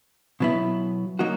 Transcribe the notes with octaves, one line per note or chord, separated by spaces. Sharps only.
B2 F#3 B3 E4
F#3 A#3 D#4 F#4